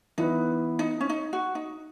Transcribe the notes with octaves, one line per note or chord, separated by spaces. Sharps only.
E3 B3 D#4 E4 B4
D#4
C#4
D#4
F#4
D#4